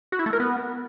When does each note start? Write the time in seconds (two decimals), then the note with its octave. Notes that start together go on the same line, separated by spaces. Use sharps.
0.12 F#4
0.19 E4
0.26 A3
0.33 A#4
0.40 B3